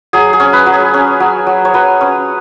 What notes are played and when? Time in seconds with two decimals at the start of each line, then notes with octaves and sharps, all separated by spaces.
0.13 F#3 G#4
0.33 G#4
0.40 C#4
0.53 B4
0.66 F#3
0.73 G#4
0.94 C#4
1.20 F#3
1.47 F#3
1.65 C#5
1.74 F#3 B4
2.01 C#4